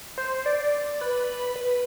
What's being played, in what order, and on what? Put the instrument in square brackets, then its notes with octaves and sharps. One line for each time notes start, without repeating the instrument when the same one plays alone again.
[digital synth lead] C5
D5
B4
B4